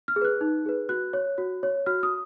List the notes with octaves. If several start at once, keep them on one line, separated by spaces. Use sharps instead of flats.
F6
G#4
B4 F#6
D#4
G#4 B4
F#4 F#6
C#5
F#4
C#5
F#4 F6
D#6